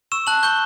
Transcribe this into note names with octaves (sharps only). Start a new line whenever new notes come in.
C#6 E6 E7
A5 F#6 F#7
C#6 G6 G7